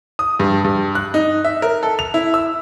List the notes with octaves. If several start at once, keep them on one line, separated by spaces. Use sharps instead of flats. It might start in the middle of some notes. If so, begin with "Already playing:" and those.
D#6
G2
G2
F#6
D#4
E5
A#4
A4
F7
E4
E6